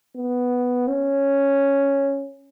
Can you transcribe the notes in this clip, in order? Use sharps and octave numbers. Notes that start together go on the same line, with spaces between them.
B3
C#4